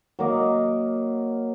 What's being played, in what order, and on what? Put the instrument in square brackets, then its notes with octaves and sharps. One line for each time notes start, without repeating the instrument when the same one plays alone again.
[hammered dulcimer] F#3 A#3 D#5